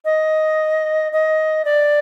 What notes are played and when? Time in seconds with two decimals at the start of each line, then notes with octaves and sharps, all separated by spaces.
0.05 D#5
1.12 D#5
1.65 D5